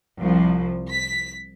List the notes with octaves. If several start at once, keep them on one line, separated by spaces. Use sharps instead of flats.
C2 F3
B6